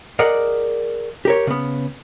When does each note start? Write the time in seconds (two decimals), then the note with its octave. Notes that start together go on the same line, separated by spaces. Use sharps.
0.19 G#4 A#4 D5 D#5 F#5
1.25 G4 A#4 C#5
1.47 C#3 B3